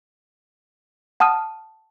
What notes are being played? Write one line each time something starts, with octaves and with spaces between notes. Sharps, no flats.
F#5 A5 D#6 F6 D#7